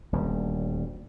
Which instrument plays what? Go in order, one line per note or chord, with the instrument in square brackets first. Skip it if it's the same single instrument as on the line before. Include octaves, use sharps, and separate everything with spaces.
[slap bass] D#1 D2 G3